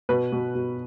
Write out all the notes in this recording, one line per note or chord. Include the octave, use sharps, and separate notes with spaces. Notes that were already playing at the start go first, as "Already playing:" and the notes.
B2 B4
B2
B2